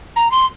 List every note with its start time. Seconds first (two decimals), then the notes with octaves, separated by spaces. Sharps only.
0.16 A#5
0.31 C6